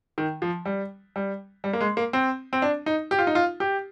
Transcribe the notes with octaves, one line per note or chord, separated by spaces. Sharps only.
D#3
F3
G3
G3
G3
A#3
G#3
A#3
C4
C4
D4
D#4
G4
F4
D#4
F4
G4